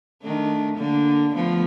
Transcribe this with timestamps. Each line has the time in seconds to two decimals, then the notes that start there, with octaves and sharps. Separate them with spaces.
0.22 D#3 A3 D4
0.78 D3 A#3 D4
1.34 F3 A3 B3